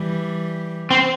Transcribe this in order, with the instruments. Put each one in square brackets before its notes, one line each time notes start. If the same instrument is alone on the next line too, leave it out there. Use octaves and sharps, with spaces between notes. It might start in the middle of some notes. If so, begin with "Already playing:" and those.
Already playing: [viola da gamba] E3 G3
[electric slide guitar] C4